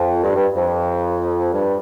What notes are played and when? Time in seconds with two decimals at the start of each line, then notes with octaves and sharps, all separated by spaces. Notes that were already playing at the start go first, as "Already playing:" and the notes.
Already playing: F2
0.24 G2
0.35 G2
0.56 F2
1.53 G2